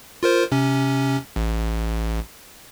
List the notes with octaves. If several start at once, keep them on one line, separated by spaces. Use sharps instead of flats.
F4 A#4 C5
C3 C#4
A1